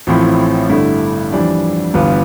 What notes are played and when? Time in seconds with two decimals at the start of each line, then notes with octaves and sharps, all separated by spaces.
0.07 A1 A2 F3 C4 E4
0.70 G2 D3 A3 E4
1.32 F2 E3 G3 D4
1.94 G1 G2 E3 B3 F4